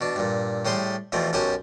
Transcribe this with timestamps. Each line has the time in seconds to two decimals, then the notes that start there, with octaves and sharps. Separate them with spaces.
0.01 B2 D4
0.16 G2 A#2
0.65 A2 G3 G#4 C5 C6
1.12 E2 B2 F3 A3 C4
1.33 B1 F#2 G4 F#5 G#5 A5